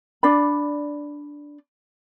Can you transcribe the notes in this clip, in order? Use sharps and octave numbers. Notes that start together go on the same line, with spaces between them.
D4 D5 B5